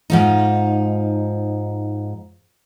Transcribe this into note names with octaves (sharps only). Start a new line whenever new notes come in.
G#2 F3 D#4